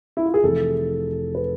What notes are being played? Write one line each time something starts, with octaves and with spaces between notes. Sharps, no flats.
E4
F4
G#4
F1 F2 E3 A4
B4